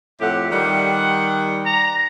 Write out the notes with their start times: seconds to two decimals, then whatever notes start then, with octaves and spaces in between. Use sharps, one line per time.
0.20 F2 A2 G4 F#5
0.51 D#3 G3 F#5
1.65 A#5